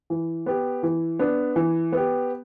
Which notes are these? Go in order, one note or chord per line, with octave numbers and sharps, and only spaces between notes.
E3
B3 G4
E3
B3 D4
E3
B3 G4